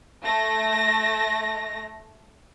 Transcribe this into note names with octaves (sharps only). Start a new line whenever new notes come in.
A3 A#6